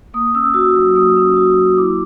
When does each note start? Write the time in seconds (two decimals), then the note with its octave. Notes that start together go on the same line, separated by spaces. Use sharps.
0.14 A#3 D#6
0.34 C#4 E6
0.54 F#4 E6
0.76 F#3
0.96 A#3 D#6
1.17 C#4
1.36 F#4
1.57 F#3
1.77 E4 D6